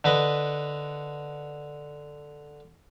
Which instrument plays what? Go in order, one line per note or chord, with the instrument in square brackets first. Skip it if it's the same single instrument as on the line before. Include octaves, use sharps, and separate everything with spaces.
[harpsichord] D3 B4 D#5